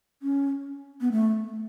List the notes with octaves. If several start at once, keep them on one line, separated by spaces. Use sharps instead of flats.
C#4
B3
A3